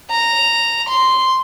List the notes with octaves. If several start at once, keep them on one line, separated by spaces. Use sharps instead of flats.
A#5
C6